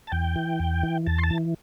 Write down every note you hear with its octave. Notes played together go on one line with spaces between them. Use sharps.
A5
E2 G5
E3
E2
E3
E2 A5
C6
A5
E3